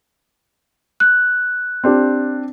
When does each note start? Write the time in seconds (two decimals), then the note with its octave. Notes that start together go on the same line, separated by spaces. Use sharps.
1.00 F#6
1.84 C4 D4 G4